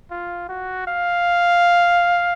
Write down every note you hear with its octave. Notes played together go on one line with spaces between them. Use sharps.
F4
F#4
F5